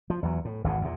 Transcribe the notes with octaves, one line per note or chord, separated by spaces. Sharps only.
F3
E2 F#3
A2
G#1 E2 B2
E2 A#2